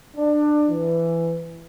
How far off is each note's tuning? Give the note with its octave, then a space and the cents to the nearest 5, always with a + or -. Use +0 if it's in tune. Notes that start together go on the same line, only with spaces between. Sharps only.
D4 +20
E3 +15